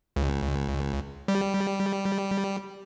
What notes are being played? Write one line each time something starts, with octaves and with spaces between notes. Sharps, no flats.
C#2
G3